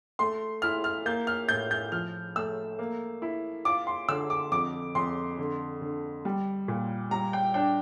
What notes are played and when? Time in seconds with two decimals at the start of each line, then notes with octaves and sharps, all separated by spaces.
0.19 A3 C6
0.62 E4 F6
0.84 F6
1.06 A#3 G6
1.27 F6
1.49 A2 G6
1.71 G6
1.92 F3 F6
2.36 A3 E6
2.79 A#3
3.22 E4
3.65 F4 D6
3.87 C6
4.08 D3 E6
4.30 D6
4.52 F2 D6
4.95 F2 C6
5.38 D3
5.82 D3
6.25 G3
6.68 A#2
7.11 G3 A#5
7.33 G5
7.54 D4 G5